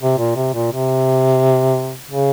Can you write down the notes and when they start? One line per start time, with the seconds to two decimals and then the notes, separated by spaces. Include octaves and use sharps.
0.01 C3
0.18 A#2
0.36 C3
0.54 A#2
0.71 C3
2.11 C#3